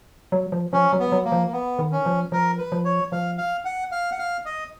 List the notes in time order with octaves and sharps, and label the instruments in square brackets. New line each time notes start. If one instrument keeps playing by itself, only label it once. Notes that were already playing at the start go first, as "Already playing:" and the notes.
[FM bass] F#3
F3
[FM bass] F3 [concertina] C#4
[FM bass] F#3
[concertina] B3
[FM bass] F#3
[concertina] A#3
[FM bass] F3
[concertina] A#3
B3
[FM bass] D#3
[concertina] C#4
[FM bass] F3
[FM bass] F3 [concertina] A#4
[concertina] B4
[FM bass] F3
[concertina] C#5
[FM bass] F3 [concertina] F5
[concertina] F5
F#5
F5
F#5
F5
D#5